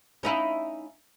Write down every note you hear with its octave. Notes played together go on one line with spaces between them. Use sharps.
C#4 D#4 E4